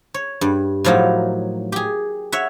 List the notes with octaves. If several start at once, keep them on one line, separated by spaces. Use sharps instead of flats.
C#5
G2
A2 F3 F#3 A#3 D#4
G4 G#4
C#5 E5 F#5